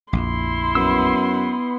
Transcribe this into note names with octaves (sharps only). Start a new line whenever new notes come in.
A#1 F2 E4 C6
F#2 B3 E6